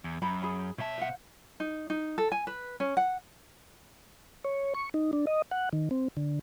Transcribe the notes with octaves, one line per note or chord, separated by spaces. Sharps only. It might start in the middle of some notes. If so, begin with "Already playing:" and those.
E2
F#2 A#5 B5
G#4 B5
B2 C#5 E5 A5
C5 F5 F#5
D#4
D#4
A4
G#5
B4
C#4
F#5
C#5
C#6
D#4
D4
D#5
F#5
D#3
C4
D3